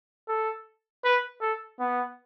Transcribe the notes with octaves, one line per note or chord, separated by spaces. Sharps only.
A4
B4
A4
B3